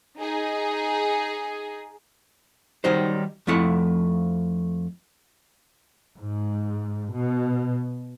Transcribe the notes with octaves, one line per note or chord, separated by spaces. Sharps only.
D#4 G#4
D#3 F#3 G3 D#4 C5
F2 F3 A3 E4 F#5
G#2
B2